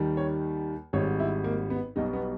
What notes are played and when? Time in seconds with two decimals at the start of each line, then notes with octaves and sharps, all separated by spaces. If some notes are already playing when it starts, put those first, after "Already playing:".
Already playing: D#2 D#3 G3
0.17 C#5
0.93 G#1 G#2 G3 C#5
1.20 E4
1.44 A#3
1.70 B3
1.96 B1 B2 G3 D#4
2.13 B3